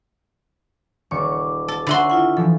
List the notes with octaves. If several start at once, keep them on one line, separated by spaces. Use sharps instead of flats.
D#1 C#6 D6
A4
D3 F#4 B4 E5 C6
E4 F4 F#5
E3 F3 A4